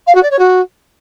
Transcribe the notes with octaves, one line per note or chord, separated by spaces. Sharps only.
F5
F#4
D5
C#5
F#4